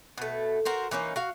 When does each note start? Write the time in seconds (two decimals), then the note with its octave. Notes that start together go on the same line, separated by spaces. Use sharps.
0.18 B2 A3
0.65 F#4 A#4 C5
0.91 E3 A#3 C#4 D#4
1.16 F#4 F5